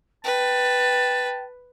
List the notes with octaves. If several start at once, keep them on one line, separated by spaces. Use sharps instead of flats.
B4 G5 A5